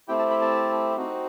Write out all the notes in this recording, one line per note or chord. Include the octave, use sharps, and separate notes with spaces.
A3 C4 E4 G4 G5
A5
B5
A5
C4 D#4 F#4